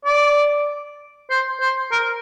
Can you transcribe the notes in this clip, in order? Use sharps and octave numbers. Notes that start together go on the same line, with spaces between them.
D5
C5
C5
A#4